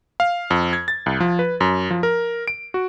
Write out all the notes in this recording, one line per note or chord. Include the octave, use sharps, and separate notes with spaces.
F5
F2
G#6
A6
C2
F3
B4
F#2
F3
A#4
D7
F#4